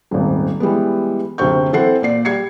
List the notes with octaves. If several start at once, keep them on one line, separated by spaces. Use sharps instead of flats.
D#1 G#1
E3 G3 G#3 B3
F#1 D2 C3 C4 C#6 G6
E3 C4 A4 F#5 C7
A#2 D5 C7
G3 G#6 C7 C#7